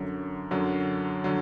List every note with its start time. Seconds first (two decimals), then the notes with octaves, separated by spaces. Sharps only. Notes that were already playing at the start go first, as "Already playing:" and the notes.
Already playing: F#2 D3 F#3
0.51 F#2 D3 F#3
1.24 D3 F#3